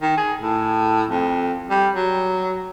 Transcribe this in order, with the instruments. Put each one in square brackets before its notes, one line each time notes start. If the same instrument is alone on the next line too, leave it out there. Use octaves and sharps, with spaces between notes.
[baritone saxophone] D#3
G#4
A2
F2
G3
F#3